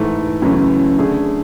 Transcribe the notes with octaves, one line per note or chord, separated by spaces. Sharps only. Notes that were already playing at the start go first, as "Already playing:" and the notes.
Already playing: G#2 E3 A3
F#2 C#3 E3 A3 C#4
D3 A3 D4 G#4